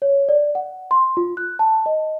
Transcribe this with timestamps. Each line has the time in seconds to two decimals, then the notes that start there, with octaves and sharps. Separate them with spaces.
0.02 C#5
0.29 D5
0.55 F#5
0.91 C6
1.17 F4
1.37 F#6
1.59 A5
1.86 D#5